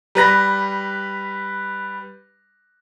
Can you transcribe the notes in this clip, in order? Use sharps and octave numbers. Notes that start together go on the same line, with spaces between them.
G3 B4 A#6